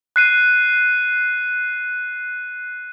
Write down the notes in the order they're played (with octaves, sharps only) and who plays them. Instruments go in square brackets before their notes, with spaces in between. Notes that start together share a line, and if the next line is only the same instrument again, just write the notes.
[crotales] F#6 C7 D#7